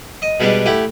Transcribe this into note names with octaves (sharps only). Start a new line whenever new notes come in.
D#5
B2 G3 G#3 B3 D4
A3 E4 G4 F#5